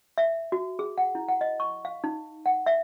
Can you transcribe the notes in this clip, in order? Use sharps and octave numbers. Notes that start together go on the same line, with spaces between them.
E5
F#4
G#4
F#5
E4
F#5
D#5
C#6
F5
D#4
F#5
E5